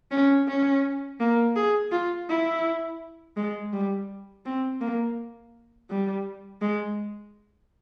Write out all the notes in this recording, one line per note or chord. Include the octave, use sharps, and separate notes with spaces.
C#4
C#4
A#3
G#4
F4
E4
G#3
G3
C4
A#3
G3
G#3